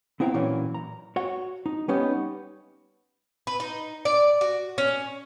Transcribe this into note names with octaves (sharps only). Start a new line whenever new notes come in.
B3 C4 E4 G5 A#5
A#2 E3 F#3 A#3 C#4
A#5
F#4 C#5 F#5
D#4
G3 B3 C#4 D#4 G4
B4
D#4
D5
F#4
C#4